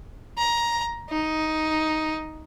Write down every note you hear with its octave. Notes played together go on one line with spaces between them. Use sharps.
A#5
D#4